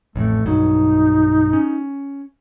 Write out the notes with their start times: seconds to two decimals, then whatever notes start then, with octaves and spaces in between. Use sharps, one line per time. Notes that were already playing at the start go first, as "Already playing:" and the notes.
0.16 A1 F2 A3
0.46 B1 G2 F#3 D#4
1.53 C#4